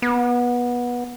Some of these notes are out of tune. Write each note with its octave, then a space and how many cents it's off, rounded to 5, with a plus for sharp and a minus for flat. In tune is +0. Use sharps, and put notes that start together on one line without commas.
B3 -20